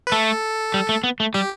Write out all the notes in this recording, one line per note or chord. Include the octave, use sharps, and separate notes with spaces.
B4
A3 A4
G3
A3
B3
A3
G3 G4